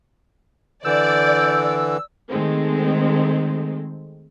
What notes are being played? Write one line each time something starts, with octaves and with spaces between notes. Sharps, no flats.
D3 E3 D5 E6 G6
D#3 G#3 A3 C4